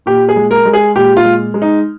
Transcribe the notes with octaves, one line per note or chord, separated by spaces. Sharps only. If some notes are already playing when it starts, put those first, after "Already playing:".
A#2 G4
G#4
G#3
A#4
G#3
G#4
A#2 G4
F4
G#3
G#3
D#4